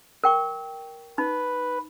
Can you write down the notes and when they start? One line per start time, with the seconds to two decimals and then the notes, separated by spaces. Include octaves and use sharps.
0.24 A#4 G5 C#6
1.18 D#4 B4